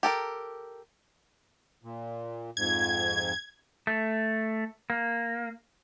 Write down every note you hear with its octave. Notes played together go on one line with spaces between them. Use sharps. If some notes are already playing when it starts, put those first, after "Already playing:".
G4 A4 A#4
A#2
F2 G#2 G#6
A3
A#3